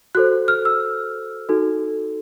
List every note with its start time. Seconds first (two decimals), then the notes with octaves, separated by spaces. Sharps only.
0.15 F#4 A4 C5 F#6
0.48 F6
0.65 E6
1.49 D#4 F#4 A4